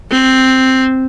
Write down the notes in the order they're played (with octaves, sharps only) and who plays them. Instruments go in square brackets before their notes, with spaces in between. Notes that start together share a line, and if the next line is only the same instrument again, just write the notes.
[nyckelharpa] C4